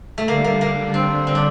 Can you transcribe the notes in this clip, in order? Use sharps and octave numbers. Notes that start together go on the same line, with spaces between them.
A3
D3 G3 A#3 D4
A#3
A#3
C4
C4
D4